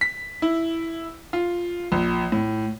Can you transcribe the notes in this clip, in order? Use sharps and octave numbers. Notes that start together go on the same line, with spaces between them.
B6
E4
F4
A#1
A2